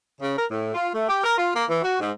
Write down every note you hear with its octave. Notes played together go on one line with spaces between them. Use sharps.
C#3
A#4
A2
F4
A3
G4
A#4
F4
A#3
E3
F#4
G#2